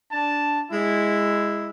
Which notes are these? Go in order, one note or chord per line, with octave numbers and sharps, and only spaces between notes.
D4 A5
G#3 E4